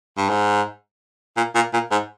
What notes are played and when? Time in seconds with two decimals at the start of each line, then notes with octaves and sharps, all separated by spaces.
0.17 G2
0.29 G#2
1.37 A#2
1.55 A#2
1.73 A#2
1.91 G#2